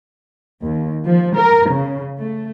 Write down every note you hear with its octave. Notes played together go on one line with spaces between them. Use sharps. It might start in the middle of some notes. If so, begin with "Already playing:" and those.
D#2
F3
A#4
C#3
A3